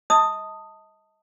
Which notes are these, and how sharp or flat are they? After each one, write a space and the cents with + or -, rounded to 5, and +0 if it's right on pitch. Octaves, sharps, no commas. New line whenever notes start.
D#5 +35 A5 +20 D#6 +0